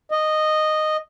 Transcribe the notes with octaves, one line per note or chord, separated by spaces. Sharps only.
D#5